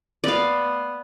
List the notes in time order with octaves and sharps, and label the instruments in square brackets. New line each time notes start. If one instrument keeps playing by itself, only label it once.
[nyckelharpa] B3 [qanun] D5 F5